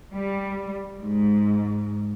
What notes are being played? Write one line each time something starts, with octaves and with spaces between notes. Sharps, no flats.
G3
G#2